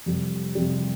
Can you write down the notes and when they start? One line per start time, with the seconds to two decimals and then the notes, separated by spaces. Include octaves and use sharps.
0.06 F2 C3 G3
0.55 F2 C3 G3